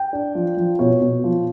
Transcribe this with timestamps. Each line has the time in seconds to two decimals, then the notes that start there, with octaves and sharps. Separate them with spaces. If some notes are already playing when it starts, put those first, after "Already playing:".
Already playing: G5
0.13 D4
0.35 F3
0.57 F3
0.79 B2 C#5
1.01 B2
1.24 F3